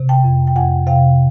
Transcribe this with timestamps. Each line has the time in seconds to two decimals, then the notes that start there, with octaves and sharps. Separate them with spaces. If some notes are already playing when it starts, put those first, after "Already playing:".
Already playing: C3
0.09 G5 A5
0.24 F2
0.47 G5
0.56 F2 F#5 G#5
0.87 C3 F5 G5